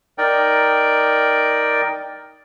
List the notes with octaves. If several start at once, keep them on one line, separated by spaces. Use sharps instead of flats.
D#4 A#4 D5 G5